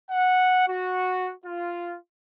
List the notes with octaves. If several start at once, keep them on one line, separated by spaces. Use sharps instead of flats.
F#5
F#4
F4